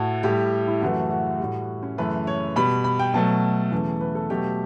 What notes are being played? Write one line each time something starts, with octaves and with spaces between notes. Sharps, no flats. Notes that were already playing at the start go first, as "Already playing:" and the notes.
Already playing: A2 A3 F#4
A2 G3 G4
E4
F#2 C#3 E3 A3 F#4
F#4
A2 G3
C#4
F#2 C#3 E3 A3 B4
C#5
B2 G3 B5
B5
G5
B2 F#3 A3 A5
E2 C#3 E3 A3
B4
A4
B2 F#3 A3 G4